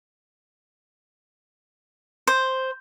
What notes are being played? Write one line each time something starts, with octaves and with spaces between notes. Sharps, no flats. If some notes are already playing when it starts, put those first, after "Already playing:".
C5